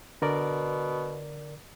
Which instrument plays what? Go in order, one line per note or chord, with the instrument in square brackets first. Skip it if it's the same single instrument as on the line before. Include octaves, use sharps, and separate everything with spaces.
[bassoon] B2 [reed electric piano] D3 A#4 D5